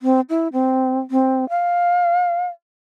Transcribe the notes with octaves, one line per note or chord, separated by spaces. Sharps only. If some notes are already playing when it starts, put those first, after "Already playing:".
C4
E4
C4
C4
F5